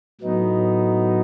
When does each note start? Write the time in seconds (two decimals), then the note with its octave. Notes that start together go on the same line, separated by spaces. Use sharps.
0.21 A2 F#3 B3 D#4